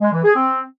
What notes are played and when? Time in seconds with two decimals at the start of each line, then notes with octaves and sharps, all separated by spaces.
0.02 G#3
0.13 E3
0.24 G#4
0.35 C4